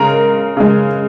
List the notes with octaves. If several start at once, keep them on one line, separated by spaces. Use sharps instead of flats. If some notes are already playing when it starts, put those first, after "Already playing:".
Already playing: C#3 G#3 A#4 A#5
C#3 G#3